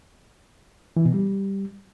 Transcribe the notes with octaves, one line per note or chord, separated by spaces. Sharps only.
E3
B2
G3